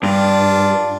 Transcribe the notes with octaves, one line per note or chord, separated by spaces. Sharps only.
G2 D4 F4